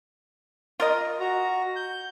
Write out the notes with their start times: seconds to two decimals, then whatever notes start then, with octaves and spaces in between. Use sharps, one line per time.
0.80 F4 A#4 D#5
1.20 F#4 A#5
1.76 G6